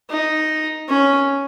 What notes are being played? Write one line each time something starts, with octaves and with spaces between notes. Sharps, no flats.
D#4
C#4